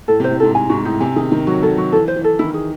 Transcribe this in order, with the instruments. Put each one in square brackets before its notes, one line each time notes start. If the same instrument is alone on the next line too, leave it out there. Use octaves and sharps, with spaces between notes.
[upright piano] A2 [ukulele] A4
[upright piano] C3 [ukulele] C5
[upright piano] A2
[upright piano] G#2 [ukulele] A4
[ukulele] G#5
[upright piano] G#2 [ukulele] F#4
[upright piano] A2 [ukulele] D#4
[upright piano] C3 [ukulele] G#5
[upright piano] D#3 [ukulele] G#4
[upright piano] D#3 [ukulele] D#4
[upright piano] F#3 [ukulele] F#4
[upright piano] F#3 [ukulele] A4
[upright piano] F#3 [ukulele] F#4
[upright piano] E3 [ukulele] A4
[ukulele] C5
[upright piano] E3
[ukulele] A4
[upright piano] D#3 [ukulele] E4
[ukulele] G#4